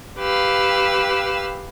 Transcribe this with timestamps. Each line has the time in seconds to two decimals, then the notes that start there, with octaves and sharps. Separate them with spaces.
0.19 G4 B4 F5 E6